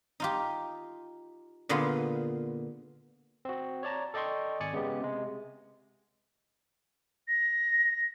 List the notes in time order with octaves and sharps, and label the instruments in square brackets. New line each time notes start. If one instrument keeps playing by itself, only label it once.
[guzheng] D#4 F4 G4
A#2 D3 B3 F4 G#4
[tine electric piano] C4 F#4
C#5 D5 A5 A#5
A4 D5 D#5 G5 C6 C#6
G#1 D5 G#5 C#7
C#3 G#3 B3 G4
C3 G#3
[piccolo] A#6